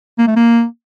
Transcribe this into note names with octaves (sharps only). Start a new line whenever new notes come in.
A#3
A3
A#3